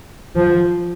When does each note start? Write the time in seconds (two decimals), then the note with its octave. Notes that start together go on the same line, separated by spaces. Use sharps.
0.36 F3